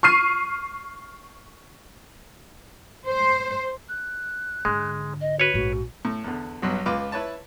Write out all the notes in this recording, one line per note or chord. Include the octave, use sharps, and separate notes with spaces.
C#6 F6 C7 D#7
C5
F#6
G#2 D3 G#3
D#5
F#4 B4 C#5
A#1 G#2 F#4
A2
E2 D3
B1 G2 F#3
C#2 F4 B4 D6
E4 B4 C#5 A5